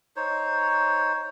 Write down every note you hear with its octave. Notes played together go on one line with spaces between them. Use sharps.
D#4 C5 C#5